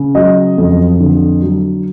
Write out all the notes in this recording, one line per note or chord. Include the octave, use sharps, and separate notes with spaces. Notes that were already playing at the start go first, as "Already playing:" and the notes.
Already playing: C#3
F#3 D#5
F2
D3
F#3